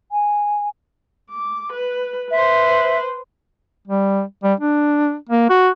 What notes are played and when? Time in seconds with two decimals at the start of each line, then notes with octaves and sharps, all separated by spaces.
0.11 G#5
1.30 D6
1.73 B4
2.31 B4 C5 E5
3.87 G3
4.43 G3
4.60 D4
5.29 A#3
5.49 F#4